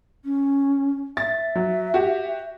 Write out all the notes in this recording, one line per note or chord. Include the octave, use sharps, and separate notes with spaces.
C#4
E5 A6
F#3
F#4 G4